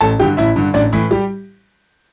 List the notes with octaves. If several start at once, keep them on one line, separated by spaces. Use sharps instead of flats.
A1 A4 A5
G2 D3 G4 G5
A1 E4 E5
G2 D3
A1 D4 D5
A2 E3 E4
G3 G4